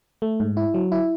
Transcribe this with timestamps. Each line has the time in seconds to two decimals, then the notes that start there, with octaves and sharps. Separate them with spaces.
0.22 A3
0.40 G#2
0.57 E4
0.74 F#3
0.92 E4